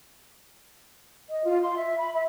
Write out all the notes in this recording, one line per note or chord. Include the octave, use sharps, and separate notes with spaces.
D#5
F4
C6
E5
B5
E5